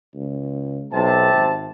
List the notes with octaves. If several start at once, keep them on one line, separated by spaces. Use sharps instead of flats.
C#2
B1 C3 A5
G#1